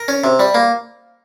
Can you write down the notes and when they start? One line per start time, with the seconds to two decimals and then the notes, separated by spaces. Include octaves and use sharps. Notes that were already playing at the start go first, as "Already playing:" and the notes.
Already playing: A#4
0.08 C#4
0.24 C3
0.40 G3
0.55 A#3